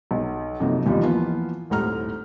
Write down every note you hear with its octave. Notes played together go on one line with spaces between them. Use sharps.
B1
F2 C3 F#3 A#3 D#4
A1 D#2 B2 E3 F3 G3
E3 F3 A#3 B3 F4
D#1 G#1 A2 A#5 F6